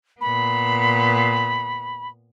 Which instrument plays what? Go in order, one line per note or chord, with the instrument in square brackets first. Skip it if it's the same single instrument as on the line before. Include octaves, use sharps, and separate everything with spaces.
[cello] A#2 B3 [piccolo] B5